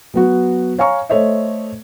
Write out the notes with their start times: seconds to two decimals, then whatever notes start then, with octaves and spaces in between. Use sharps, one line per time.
0.14 F#3 B3 F#4
0.78 C#5 F5 G#5 A#5 C#6
1.10 A3 A4 C5 C#5 D#5 E5